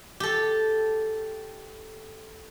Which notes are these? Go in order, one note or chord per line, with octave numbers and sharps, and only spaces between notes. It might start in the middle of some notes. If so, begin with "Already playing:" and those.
G4 A4